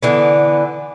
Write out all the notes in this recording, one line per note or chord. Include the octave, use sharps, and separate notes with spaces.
D3 E3 B3